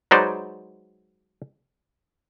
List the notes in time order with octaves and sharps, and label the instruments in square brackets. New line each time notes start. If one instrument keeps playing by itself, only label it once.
[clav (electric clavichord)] F#3 G#3 D#4 B4 C5 D5